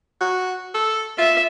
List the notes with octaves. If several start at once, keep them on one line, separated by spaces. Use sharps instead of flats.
F#4
A4
F4 E5